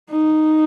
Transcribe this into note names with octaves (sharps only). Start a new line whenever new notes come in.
D#4